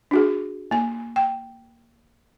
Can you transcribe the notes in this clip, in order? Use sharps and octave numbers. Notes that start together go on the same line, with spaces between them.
D4 F#4 G#4
A#3 G#5
G5